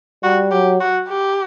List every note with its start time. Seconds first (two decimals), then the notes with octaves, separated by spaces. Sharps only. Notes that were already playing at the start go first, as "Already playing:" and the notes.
0.23 G3 F#4
0.51 F#3 G4
0.81 F#4
1.09 G4